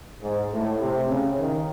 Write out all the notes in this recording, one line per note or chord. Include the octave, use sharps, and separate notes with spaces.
G#2
A2
C3
C#3
D#3